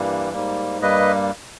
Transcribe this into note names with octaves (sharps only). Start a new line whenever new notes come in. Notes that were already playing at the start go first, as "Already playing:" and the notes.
Already playing: G2 E3 G3 A#3
G#2 G3 A#3
G2 G3 A#3 B4 D#5